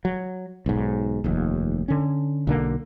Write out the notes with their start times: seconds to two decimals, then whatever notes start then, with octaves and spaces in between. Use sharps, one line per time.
0.05 F#3
0.66 B1 G#2
1.24 F1 D#2
1.88 D3 C#4
2.47 B1 D3 A#3